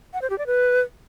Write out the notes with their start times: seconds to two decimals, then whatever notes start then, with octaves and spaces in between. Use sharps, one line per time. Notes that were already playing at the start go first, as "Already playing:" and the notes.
0.13 F#5
0.22 C5
0.30 G4
0.38 D5
0.47 B4